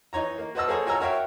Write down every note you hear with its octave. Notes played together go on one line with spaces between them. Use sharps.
E3 D#4 C#5 A#5
A#3
F#4 B4 C5 D#5 A5 E6
A#3 G#4 A4 C5 C#5 D#5
F4 F#4 C#5 G#5 A#5 E6
F#4 A#4 C#5 E5 F5 G5